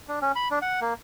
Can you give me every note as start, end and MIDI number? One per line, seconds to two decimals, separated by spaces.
0.08 0.19 62
0.22 0.32 61
0.36 0.48 83
0.51 0.59 62
0.62 0.80 78
0.81 0.94 58